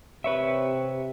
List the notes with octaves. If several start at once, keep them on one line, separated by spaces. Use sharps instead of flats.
C3 B4 C#5 E5